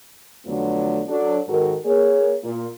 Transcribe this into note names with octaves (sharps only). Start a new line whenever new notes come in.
F2 D3 F#3 A3 B3 F4
F#3 D4 A4
G#2 D#3 F#4 A4 A#4
A#3 G#4 C#5
A#2 A#3 F4